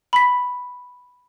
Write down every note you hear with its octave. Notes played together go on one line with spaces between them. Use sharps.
B5 B6